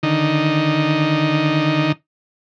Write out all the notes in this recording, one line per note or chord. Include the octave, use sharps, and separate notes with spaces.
D3 D#3 D#4